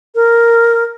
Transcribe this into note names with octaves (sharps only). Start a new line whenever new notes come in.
A#4